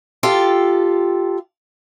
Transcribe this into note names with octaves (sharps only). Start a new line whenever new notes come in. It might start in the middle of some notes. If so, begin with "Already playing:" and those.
F4 G4 A4